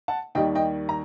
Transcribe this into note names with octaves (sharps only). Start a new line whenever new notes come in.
F#5 A5
D#2 D#3 G3 D#5 G5
D#5 G5
A#5